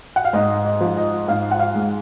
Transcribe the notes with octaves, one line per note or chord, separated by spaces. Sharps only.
F#5
F5
G#2 D#5
D#5
F3
D#5
G#2 F5
F#5
F5
G#3